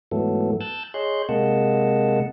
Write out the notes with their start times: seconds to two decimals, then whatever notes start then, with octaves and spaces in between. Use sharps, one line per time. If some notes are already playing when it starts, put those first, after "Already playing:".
0.12 G#2 E3 F#3 A3 B3 A4
0.61 A5 E6 F#6 G6 A6
0.94 G#4 C#5 D#5 C6 F#6 G6
1.29 C3 G#3 A#3 D#5 F#5 A5